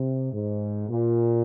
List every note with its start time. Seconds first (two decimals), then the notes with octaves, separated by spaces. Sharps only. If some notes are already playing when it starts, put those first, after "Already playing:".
Already playing: C3
0.33 G#2
0.89 A#2